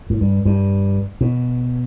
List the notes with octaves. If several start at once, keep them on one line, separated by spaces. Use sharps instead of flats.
A2
G2
G2
B2